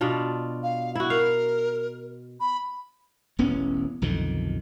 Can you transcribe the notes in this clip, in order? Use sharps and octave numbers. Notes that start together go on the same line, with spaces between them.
B2 D4 F4
F5
E4 F#4
A#4 F5
B5
E1 A1 B3 C#4
B1 F2 D3 D#3